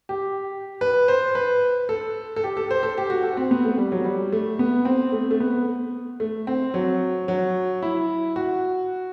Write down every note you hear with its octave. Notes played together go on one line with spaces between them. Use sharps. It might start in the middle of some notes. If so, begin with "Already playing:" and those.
G4
B4
C5
B4
A4
A4
G4
A4
C5
A4
G4
F#4
A4
C4
B3
A3
G3
F#3
G3
A3
B3
C4
A3
A3
B3
A3
C4
F#3
F#3
E4
F#4